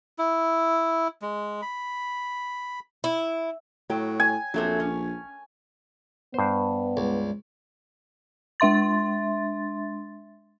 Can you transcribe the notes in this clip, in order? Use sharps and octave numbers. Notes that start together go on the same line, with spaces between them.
E4
G#3
B5
E4
A2 F#3 G5
G#5
A#1 F#3 A3 C4
C#4
G2 B3 C5
C#2
G#3 D4 E5 C6 A6